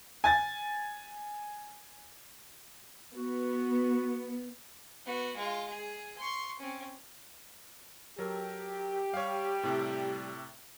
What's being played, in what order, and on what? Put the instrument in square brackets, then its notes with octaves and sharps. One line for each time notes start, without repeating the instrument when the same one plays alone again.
[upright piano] G#5 A6
[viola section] B3 [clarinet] F#4
[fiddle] B3 F#4
G#3 F4
G#4
C6 C#6
C4 C#4
[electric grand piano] F#3 A4 A#4 [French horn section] G4
[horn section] G3 [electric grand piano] C#5 F5
[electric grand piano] A2 C3 A4